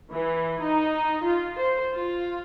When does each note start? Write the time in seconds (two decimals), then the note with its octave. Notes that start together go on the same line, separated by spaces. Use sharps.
0.11 E3
0.61 D#4
1.23 F4
1.59 C5
1.92 F4